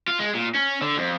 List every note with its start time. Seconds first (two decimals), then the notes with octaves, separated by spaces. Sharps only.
0.08 F4
0.19 G#3
0.34 A#2
0.54 C#4
0.82 D3
0.97 F2